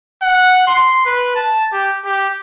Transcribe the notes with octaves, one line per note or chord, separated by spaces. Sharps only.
F#5
C6
B4
A5
G4
G4